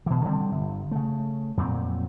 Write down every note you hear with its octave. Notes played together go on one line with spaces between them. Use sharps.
B2 E3
D3 G3 C4
G1
C#3 A3
F2 A#2 F#3 C4